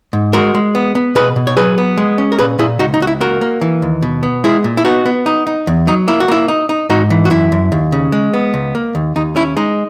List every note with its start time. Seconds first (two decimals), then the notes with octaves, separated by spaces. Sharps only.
0.13 G#2
0.33 G#3 F#4 A#4
0.55 G#3
0.75 B3
0.95 B3
1.15 B2 G#4 B4
1.36 B2
1.47 C#5
1.57 F#3 G#4 B4
1.78 B3
1.97 G#3
2.18 C#4
2.32 A#4
2.39 A#2 G#4 B4
2.59 A#2 E4 G#4
2.79 C#2 D#4 F#4
2.94 D#4
3.00 C#2 F#4
3.07 E4
3.21 A#3 F#4 A#4
3.41 A#3
3.61 E3
3.82 D#2
4.02 B2
4.23 B3
4.44 G#3 E4 G#4
4.64 A#2
4.77 E4
4.85 B3 D#4 F#4
5.05 B3
5.26 D#4
5.47 D#4
5.67 E2
5.87 F#3 D#4
6.08 A#3 E4
6.20 F#4
6.28 A#3 E4
6.48 D#4
6.69 D#4
6.89 G#2 D#4 F#4
7.10 E3
7.25 F#4
7.30 F#2 E4
7.52 F#2
7.72 D#2
7.92 C#3
8.12 G#3
8.33 B3
8.54 C#2
8.75 A#3
8.95 D#2
9.16 D#2 D#4
9.36 C#4 E4
9.57 G#3 D#4